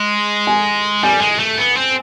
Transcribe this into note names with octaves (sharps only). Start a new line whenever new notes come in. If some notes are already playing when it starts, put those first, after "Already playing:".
Already playing: G#3
G#5
G3 G#5
G#3
A3
B3
C4